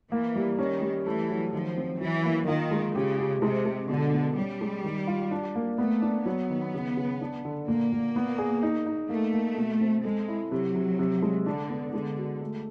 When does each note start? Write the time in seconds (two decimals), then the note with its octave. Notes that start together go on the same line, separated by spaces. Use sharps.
0.11 E3 A#3
0.36 G3
0.59 D#3 C#4
0.82 G3
1.05 E3 A3
1.30 F#3
1.53 D#3 F3
1.77 C4
2.01 E3 F#3
2.24 A#3
2.48 D#3 F4
2.71 G#3
2.95 C#3 G4
3.19 G4
3.42 C3 G#3
3.65 G#3
3.89 B2 D3
4.14 B3
4.37 G3 C#4
4.61 G#3
4.84 D#3
5.07 F4
5.31 D4
5.55 A#3
5.78 A3 B3
6.02 D4
6.26 F#3 B3
6.50 D#3
6.74 C#3
6.97 C#3
7.21 D4
7.45 D3
7.68 A#2 A#3
7.92 A#2
8.16 B3
8.38 G#4
8.63 D#4
8.86 D#4
9.09 A3 A#3
9.33 A#3
9.57 B2
9.81 C4
10.04 G#3 A4
10.28 E4
10.52 C3 F#3
10.76 C3
10.99 C3
11.22 G#3
11.46 D3 D4
11.70 B3
11.93 D3 G#3
12.17 F#4
12.42 A3